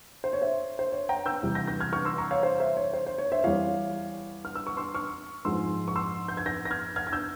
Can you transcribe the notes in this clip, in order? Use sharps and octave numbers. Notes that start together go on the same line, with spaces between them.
C5
C#5
C5 E5
C5
C#5
G5 A#5
E6 G6
E2 C3 G3
G6 A#6
G6 A#6
F6 G#6
C#6 F6
C6 E6
A#5 C#6
C#5 F5
C5
C5 E5
C#5
C5
C5
C#5
C5 E5
E2 E3 G3 C#5 F5
F6
E6
C#6
C6 E6
C#6 F6
G#2 F3 G#3 C6 E6
C#6
C6 E6
G6
G#6
G6 A#6
A#6
F6 G#6
F6 G#6
G#6
E6 G6